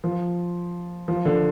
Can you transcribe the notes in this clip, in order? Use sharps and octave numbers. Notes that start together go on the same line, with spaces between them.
F3
F3
D3